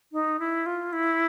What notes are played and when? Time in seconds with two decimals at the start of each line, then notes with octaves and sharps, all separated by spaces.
0.13 D#4
0.39 E4
0.66 F4
0.93 E4